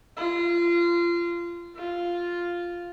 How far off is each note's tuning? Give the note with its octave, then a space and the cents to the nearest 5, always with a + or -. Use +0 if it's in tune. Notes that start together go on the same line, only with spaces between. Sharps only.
F4 -25
F4 +0